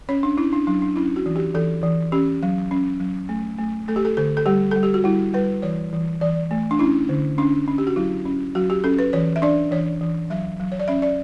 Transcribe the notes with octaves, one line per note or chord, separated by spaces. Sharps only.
C#4 C#5
D4
C#4 E4
D4
F#3 D4
D4
C#4 E4
F#4
E3
G4
E3 A4
E3
C#4 G4
F#3
C#4
F#3
A3
A3
A3 A4
G4
A4
D3 A4
A4
G3 G4
G3 A4
G4
F#4
G3 E4
G3 B4
E3 C#5
E3
E3 D5
A3
D4
C#4 E4
D3
C#4 D4
C#4
G4
F#4
F#3 E4
C#4
F#3 F#4
G4
C#4 A4
B4
E3 C#5
E5
D4 D5
E3 C#5
E3
F#3 E5
F#3
C#5
D5
C#4 E5
D5